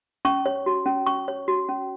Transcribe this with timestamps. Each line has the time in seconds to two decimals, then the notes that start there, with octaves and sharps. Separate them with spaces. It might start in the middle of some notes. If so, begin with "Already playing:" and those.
0.25 C#4 C#6
0.46 C#5
0.66 F#4
0.86 C#4
1.06 C#4 C#6
1.28 C#5
1.48 F#4
1.69 C#4